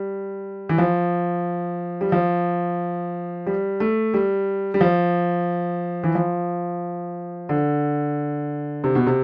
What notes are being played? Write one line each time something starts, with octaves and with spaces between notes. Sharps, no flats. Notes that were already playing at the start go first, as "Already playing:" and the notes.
Already playing: G3
E3
F3
G3
F3
G3
A3
G3
G3
F3
E3
F3
D3
C3
B2
C3